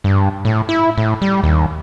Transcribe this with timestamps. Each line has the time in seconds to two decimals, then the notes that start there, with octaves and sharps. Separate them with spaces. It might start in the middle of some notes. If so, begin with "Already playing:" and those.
0.04 G2
0.45 A2
0.69 E4
0.98 A2
1.22 G3
1.43 D#2